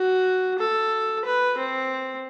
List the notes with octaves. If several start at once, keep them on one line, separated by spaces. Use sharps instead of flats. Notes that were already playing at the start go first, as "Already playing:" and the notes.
Already playing: F#4
A4
B4
C4